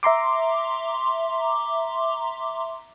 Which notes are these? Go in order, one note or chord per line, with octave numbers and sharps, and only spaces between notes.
E5 A#5 C6 D6